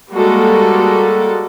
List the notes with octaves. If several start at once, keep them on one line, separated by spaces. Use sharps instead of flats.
G3 G#3 A#3 F#4 A4